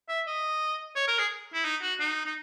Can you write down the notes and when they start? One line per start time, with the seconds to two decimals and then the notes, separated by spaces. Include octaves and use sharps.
0.09 E5
0.27 D#5
0.96 C#5
1.08 A#4
1.19 G#4
1.54 E4
1.65 D#4
1.82 F#4
2.00 D#4
2.26 D#4